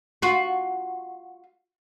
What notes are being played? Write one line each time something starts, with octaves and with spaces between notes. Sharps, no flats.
F4 F#4